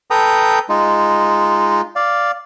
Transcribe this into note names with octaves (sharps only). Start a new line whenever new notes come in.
A4 B4 G5 A#5 D#6
G#3 D#4 F4
D5 F5